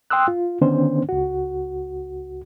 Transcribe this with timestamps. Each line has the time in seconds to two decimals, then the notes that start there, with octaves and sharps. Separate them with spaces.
0.10 G5 C6 D#6 E6 F#6
0.28 F4
0.61 D3 D#3 B3 C#4 D4 C5
1.09 C#2 F#4